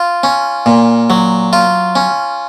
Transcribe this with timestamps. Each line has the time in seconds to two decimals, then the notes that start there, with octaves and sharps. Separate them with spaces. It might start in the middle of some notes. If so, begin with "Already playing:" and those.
Already playing: F4
0.23 C#4
0.66 A#2
1.10 F#3
1.53 F4
1.96 C#4